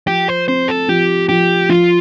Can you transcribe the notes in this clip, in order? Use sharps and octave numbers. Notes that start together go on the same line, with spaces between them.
F3 G4
C5
C4 C5
A4
F3 G4
F3 G4
F3 F4